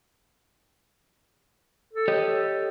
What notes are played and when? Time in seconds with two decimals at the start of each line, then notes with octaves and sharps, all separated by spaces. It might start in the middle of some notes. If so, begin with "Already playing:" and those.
1.93 A4
2.08 G4 C#5 D#5